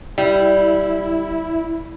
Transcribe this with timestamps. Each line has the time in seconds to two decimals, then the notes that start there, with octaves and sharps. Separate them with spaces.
0.18 G3 E4